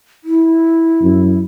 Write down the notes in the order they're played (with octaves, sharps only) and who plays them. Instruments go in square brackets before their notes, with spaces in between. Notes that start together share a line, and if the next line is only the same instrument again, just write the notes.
[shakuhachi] E4
[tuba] F#2